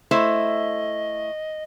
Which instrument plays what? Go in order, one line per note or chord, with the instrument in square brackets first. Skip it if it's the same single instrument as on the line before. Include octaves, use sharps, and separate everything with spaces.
[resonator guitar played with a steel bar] A3 E4 C5 [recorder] D#5